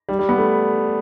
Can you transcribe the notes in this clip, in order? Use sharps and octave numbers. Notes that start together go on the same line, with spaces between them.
G3
G3
B3
A3